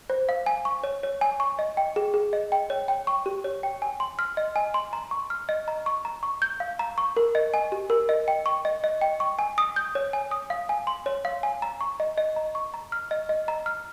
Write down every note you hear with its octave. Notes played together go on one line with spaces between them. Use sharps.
C5
F5
G#5
C#6
C#5
C#5
G#5
C#6
D#5
G5
G#4
G#4
D#5
G5
C#5
G5
C#6
G4
C#5
G5
G#5
C6
F6
D#5
G#5
C6
A#5
C#6
F6
D#5
A#5
C#6
A#5
C#6
G6
F5
A#5
C#6
A#4
D#5
G#5
G4
A#4
D#5
G5
C#6
D#5
D#5
G5
C#6
G#5
D#6
G6
C#5
G#5
D#6
F5
G#5
C6
C#5
F5
G#5
A#5
C#6
D#5
D#5
A#5
C#6
A#5
F6
D#5
D#5
A#5
F6